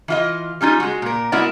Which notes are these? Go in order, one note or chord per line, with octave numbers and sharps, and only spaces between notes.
E3 F4 D#5
G3 C#4 D#4 F4
G#3 F#4
A#2 A#4
G#3 B3 E4 F#4 A#4 D5